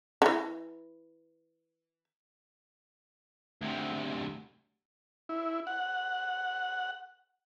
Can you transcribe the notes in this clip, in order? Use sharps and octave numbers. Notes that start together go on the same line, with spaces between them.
D3 E3
D2 C3
E4
F#5